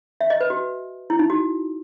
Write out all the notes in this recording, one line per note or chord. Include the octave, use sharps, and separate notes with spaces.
E5
D#5
B4
F#4
E4
D#4
F#4